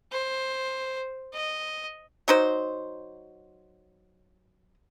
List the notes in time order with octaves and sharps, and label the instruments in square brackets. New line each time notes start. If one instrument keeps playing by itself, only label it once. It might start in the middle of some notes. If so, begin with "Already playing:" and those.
[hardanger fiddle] C5
D#5
[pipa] F#3 D#4 C5